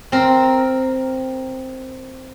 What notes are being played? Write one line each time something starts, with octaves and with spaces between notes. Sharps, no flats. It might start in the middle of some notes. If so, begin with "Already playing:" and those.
C4 A#4